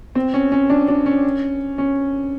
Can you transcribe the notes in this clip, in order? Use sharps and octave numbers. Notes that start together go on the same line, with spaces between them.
C4
C#4
C#4
D4
D4
C#4
C#4